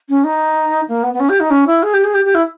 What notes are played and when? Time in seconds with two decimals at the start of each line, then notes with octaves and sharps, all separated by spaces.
0.09 C#4
0.24 D#4
0.88 A#3
1.03 B3
1.14 B3
1.20 C#4
1.29 G4
1.40 D#4
1.50 C#4
1.67 E4
1.83 G#4
1.94 G4
2.04 G#4
2.14 G4
2.25 G4
2.35 E4